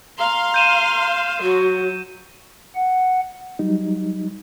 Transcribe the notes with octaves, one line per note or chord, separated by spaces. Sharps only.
F5 A#5 C6
G6 D#7 E7
F#3 F#4
F#5
F#3 G3 D#4